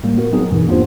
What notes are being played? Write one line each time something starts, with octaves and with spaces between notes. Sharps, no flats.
A2 G3 A#3
B3 F#4 A#4
F#3 B3 C4 D#4 G#4
G1 E2 G2 B2 E3
A#3 B3 D4 F4 G4 C5